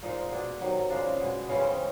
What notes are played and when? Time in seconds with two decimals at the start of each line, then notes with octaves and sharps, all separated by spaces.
0.03 A#2 F3 G#3 D#4
0.32 B2 G#3 D4
0.61 C3 D#3 F#3
0.90 C#3 F3 G#3 D4
1.21 B2 G#3
1.49 C#3 E3 G#3 C#4
1.60 C4
1.71 C#4